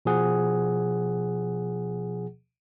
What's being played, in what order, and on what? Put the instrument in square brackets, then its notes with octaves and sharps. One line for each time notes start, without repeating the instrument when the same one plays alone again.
[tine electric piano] B2 F3 G#4 F#5